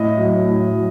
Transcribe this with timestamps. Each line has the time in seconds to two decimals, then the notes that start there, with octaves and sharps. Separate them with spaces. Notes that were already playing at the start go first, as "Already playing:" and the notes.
Already playing: A2 D#5
0.17 F#3
0.45 A2
0.72 F#3